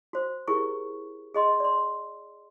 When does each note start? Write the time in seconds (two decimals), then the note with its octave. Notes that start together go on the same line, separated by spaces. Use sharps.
0.13 F#4 C5
0.48 E4 G4 G#4 A#4 C#6
1.34 G#4 D#5 C6
1.60 D5 C6